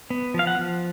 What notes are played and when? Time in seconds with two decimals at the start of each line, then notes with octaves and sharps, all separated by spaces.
0.10 B3
0.34 F3 F5
0.47 F#5
0.59 F3